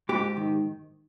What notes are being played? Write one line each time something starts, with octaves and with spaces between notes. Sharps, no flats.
G#2 G4
D#3